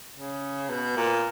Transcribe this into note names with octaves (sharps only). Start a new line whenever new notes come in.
C#3
B2
A#2